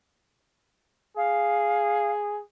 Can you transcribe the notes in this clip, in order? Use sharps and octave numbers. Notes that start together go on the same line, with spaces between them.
G#4 F5